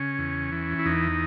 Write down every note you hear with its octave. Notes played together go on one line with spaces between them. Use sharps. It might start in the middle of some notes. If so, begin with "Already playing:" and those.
Already playing: C#3 C#4
E2
E3
E4
E2 D#4